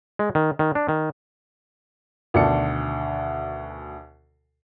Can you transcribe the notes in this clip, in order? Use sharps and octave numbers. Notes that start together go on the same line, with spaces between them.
G#3
D#3
D#3
D4
D#3
D2 B2 D#3 D5 A5 C#7